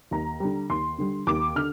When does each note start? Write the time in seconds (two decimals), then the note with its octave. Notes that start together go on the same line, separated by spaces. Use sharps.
0.11 D#2 A#5
0.40 D3 G3
0.70 D#2 C6
0.98 D3 G3
1.27 D#2 D6
1.56 D3 F6